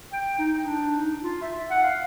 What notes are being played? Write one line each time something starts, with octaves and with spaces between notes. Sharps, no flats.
G5
D#4
D4
D#4
F4
E5
F#5
F5